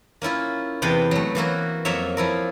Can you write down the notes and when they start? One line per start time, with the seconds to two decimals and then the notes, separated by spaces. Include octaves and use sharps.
0.22 A#3 C#4 E4 F4
0.82 E2 C3 B3 B4 C5 G5
1.11 F#3 A3
1.35 E3 A#3 E4 F#4
1.85 F2 F#3 A#3 C#5 E5
2.17 F3 E4 A#4